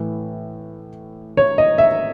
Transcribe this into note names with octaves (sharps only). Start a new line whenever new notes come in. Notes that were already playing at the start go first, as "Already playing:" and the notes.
Already playing: A2 E3
C#5
D#5
E5